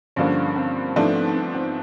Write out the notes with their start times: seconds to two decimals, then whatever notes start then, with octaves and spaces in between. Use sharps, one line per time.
0.16 G2 D3 F3 A#3 C#4 D4
0.56 C4
0.96 G#2 F3 A3 B3 D4
1.16 C4
1.35 B3
1.54 C4